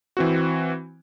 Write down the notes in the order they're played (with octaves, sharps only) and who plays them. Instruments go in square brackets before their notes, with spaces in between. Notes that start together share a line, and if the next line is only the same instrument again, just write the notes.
[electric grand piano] E3 C4 F#4